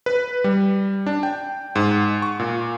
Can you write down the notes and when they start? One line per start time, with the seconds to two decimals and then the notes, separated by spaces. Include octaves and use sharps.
0.06 B4
0.44 G3
1.06 D4
1.23 G5
1.75 G#2
2.22 C#6
2.39 A#2